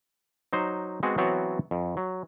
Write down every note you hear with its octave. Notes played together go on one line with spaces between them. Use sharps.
F#3 D#4 C5
G#3 B3 C4 F#4 G#4
E3 F#3 B3 C4 F#4 C#5
F2
F#3